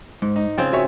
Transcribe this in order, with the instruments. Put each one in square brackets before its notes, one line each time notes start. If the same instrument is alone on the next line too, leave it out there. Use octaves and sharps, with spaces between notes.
[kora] G#2 [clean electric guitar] G#3
[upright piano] D#4
[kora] C#3 C4 F4 [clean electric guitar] G5
[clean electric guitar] F#4 [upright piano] C#5 E5 G#5